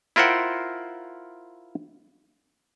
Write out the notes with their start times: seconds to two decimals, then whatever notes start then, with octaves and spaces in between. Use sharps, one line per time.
0.16 E4 F4 A#4 C5 F#5 G5